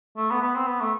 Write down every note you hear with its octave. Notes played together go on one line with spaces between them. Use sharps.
A3
B3
B3
C4
B3
A3